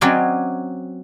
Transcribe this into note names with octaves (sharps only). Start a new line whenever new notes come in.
F#3 C4 C#4 D5 D#5 G#5